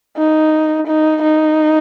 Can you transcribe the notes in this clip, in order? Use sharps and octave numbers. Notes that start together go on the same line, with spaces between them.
D#4
D#4
D#4